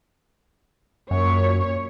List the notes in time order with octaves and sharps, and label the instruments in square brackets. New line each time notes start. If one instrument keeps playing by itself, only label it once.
[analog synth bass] F#2 [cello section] A#2 C#5